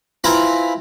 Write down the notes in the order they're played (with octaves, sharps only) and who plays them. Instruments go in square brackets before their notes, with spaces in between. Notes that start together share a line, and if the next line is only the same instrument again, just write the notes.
[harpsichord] C4 E4 F4 B4 G#5 A#5